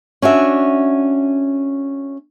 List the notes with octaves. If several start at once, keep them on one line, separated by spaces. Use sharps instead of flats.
C#4 D4 F#4 E5